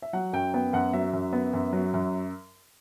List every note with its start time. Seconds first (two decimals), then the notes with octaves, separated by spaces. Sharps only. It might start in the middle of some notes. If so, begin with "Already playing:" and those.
0.02 E5
0.13 F#3 F#5
0.33 F#2 G5
0.54 B3 G5
0.73 F#2 F#5
0.93 F#3 E5
1.13 F#2
1.33 B3
1.53 F#2
1.73 F#3
1.94 F#2